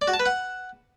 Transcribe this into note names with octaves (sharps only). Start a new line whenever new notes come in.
D5
F#4
A5
B4
F#5